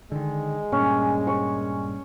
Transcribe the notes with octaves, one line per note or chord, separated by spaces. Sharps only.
D3 D#3 G#3
G2 A#2 C#4
C#6